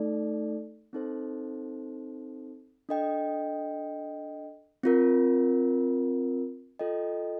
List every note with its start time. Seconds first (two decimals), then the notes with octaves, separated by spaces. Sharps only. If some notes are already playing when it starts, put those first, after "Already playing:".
Already playing: A3 D#4 A4 D5
0.93 C4 D#4 A4 C5
2.89 D4 A4 D#5 G5
4.84 C4 F4 A#4
6.79 F4 A4 D#5 G5